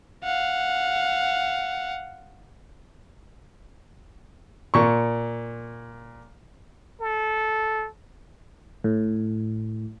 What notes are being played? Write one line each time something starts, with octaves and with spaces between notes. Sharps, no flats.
F5 F#5
A#2 C#6
A4
A2